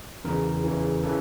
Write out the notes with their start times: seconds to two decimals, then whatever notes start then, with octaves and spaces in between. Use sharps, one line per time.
0.24 E2 C#3 E3 A#4
0.64 E2 C#3 E3
1.03 C#3 E3 A4